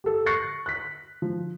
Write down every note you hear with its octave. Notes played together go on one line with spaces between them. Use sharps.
G4 A4
C#6 F#6 A6 A#6 C7 C#7
F#6 B6
F3